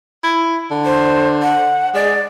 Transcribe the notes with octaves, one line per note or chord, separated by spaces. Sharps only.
E4
D3
C5
F#5
G#3 D5